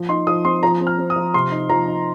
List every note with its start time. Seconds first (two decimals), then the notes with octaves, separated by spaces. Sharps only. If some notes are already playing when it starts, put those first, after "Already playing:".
Already playing: F3
0.09 D#4 C6
0.27 F3 D#6
0.44 C4 C6
0.63 F3 A#5
0.80 C4
0.87 F6
0.98 C4
1.10 D#6
1.16 F3
1.34 C3 C6
1.52 D#4
1.70 F3 A#5
1.88 D#4